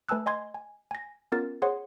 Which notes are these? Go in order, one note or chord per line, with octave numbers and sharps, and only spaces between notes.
A3 B4 G#5 A5 E6 F#6
D#5 G#5 C6 G#6
G#5
G#5 A#6
B3 C#4 F4 A#4 A6
G#4 C5 C#5 F#5 C6